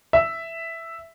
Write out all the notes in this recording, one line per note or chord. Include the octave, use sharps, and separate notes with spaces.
E5